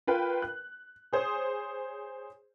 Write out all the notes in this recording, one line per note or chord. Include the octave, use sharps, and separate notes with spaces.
F4 A#4 B4 G5
F#6
G#4 C5 C#5 D#6